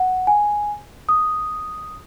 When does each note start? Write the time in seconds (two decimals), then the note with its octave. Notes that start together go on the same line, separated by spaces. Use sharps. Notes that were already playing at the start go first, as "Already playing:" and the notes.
Already playing: F#5
0.27 G#5
1.09 D#6